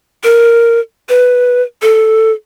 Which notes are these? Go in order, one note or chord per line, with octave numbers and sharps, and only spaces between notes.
A#4
B4
A4